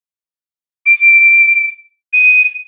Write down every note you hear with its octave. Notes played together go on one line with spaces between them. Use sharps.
D7
D#7